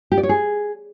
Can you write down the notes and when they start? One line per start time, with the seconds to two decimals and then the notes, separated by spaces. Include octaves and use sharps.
0.12 G4
0.17 D5
0.23 C#5
0.29 G#4